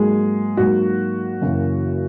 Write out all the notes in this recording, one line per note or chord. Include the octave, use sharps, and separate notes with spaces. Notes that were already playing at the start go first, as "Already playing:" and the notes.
Already playing: G#2 F#3 G#3 A#3 G#4
G#2 F#3 A#3 F#4
F#2 C#3 E3 A#3